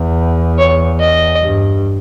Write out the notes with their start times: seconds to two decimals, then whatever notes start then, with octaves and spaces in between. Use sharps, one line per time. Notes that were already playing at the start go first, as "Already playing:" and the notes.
Already playing: E2
0.58 C#5
1.00 D#5
1.42 G2